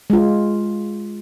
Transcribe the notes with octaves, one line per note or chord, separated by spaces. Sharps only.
G#3 F4